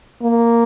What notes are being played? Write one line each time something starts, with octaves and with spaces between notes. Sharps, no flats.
A#3